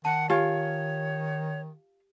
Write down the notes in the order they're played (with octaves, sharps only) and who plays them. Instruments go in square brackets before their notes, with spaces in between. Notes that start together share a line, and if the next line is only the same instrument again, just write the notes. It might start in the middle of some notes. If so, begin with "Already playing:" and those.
[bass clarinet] D#3 [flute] F#5 [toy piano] A5
[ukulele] F4 [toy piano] G4 G#5 [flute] C#5